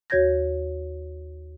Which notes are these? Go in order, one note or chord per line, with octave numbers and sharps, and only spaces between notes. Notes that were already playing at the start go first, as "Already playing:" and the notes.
D#2 F#4 C#5 G6 G#6 A#6